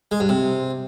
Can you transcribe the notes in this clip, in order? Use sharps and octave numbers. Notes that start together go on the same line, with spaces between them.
G#3
G2
C3